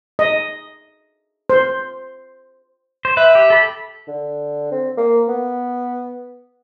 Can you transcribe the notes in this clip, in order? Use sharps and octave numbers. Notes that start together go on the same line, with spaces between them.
D#5
C5
C5
B4 E5
G4
A4 B5
D3
C4
A#3
B3